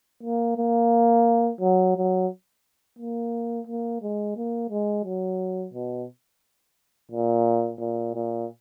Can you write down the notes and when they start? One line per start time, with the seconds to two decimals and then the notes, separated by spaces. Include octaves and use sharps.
0.23 A#3
0.58 A#3
1.61 F#3
1.96 F#3
2.99 A#3
3.67 A#3
4.02 G#3
4.37 A#3
4.70 G#3
5.05 F#3
5.74 B2
7.11 A#2
7.80 A#2
8.15 A#2